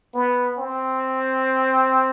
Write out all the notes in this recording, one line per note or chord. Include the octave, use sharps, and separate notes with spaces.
B3
C4